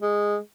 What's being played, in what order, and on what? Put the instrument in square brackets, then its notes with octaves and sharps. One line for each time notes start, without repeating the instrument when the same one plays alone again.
[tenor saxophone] G#3